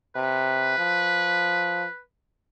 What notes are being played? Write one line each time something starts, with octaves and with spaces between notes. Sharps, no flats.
C3 B4
F3